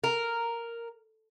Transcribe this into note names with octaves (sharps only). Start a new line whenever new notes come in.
A#4